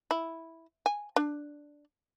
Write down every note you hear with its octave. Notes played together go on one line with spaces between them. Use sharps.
E4
G#5
D4